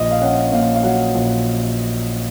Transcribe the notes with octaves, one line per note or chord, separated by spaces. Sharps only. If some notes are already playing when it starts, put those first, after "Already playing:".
Already playing: A#1 D#5
F5
C#4 F#5
A#2 F5
F5
F#3 F#5
A#1